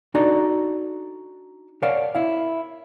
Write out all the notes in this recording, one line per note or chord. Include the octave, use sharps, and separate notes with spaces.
D4 D#4 F#4 A4 D5 A#5
A#4 C#5 D5 F5 F#5 A5
E4 F5